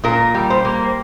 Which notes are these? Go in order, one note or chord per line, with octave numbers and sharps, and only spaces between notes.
A#2 A#4
G3
C5
A#3